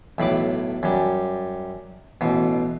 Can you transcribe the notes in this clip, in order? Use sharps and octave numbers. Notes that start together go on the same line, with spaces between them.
B1 A2 B5 D6
F#2 G3
A1 B2